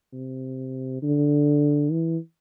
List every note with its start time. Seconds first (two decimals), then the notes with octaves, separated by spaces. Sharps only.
0.13 C3
1.02 D3
1.92 E3